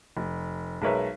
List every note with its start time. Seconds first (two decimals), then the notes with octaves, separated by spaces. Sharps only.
0.17 F1
0.82 B1 G#3 A#4 B4 C#5 E5